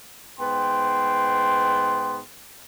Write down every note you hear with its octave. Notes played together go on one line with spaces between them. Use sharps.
G#2 B3 G5 C6